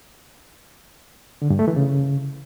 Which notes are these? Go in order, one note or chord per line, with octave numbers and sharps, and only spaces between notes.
D3
G2
A3
E3
C#3